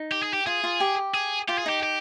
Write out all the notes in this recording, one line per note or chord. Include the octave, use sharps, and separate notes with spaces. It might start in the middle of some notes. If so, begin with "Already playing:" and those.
Already playing: D#4
G4
G#4
G4
F4 G#4
F4
G4
G#4
F4 G4
G#4
D#4 G4
G4